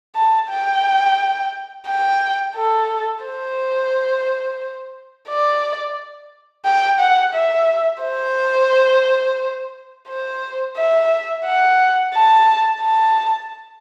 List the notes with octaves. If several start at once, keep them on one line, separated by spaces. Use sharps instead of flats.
A5
G5
G5
A4
C5
D5
G5
F#5
E5
C5
C5
E5
F#5
A5
A5